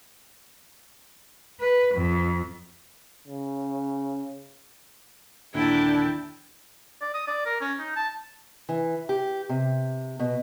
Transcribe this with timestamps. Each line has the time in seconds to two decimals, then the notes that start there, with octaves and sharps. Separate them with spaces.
1.60 B4
1.94 F2
3.28 C#3
5.55 D#2 A#2 D3 D4 E4 G5 A5
7.01 D5
7.14 D#6
7.27 D5
7.45 A#4
7.61 C#4
7.79 D#4
7.96 A5
8.69 E3
9.09 G4
9.49 C3
10.19 B2